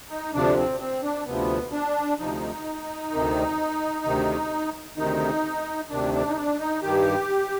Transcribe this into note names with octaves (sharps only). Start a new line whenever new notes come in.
D#4
D2 C3 F3 D4
C4
C4
D4
D2 C3 F3 B3
D4
D2 C3 F3 D#4
D2 C3 D#3
D2 C3 D#3
D2 C3 D#3 D#4
D2 C3 D#3 D4
D4
D#4
D4
D#4
G2 D#3 G4